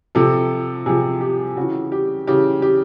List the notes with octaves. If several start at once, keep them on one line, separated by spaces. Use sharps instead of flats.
C3 F3 A4
C3 F3 G#4
G4
C#3 E3 F#4
G4
C#3 E3 G4
G4